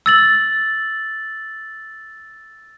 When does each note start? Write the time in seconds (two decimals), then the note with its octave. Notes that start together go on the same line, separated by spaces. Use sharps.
0.06 E6 A6 F#7